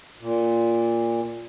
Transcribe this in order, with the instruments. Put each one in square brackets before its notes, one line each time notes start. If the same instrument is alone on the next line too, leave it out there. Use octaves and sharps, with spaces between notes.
[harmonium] A#2